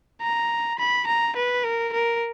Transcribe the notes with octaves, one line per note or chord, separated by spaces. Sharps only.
A#5
B5
A#5
B4
A#4
A#4